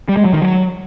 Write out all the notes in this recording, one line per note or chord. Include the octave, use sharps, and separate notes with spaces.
G3
G#3
F#3
D#3
F#3